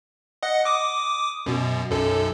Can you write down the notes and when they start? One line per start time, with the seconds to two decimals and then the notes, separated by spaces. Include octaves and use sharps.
0.43 D#5 F#5
0.65 D6 D#6
1.46 F#2 B2
1.91 B1 F#2 A4